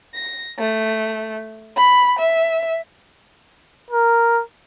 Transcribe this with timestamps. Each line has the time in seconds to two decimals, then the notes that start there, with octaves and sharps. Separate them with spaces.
0.15 A#6
0.59 A3
1.76 B5
2.19 E5
3.91 A#4